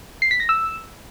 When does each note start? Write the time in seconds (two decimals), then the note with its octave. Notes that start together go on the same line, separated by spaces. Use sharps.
0.22 C7
0.31 B6
0.40 A#6
0.49 E6